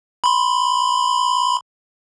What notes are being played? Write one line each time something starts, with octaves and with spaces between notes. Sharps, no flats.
B5 C6